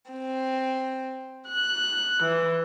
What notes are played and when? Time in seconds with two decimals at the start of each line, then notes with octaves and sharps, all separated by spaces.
0.11 C4
1.49 F#6
2.23 E3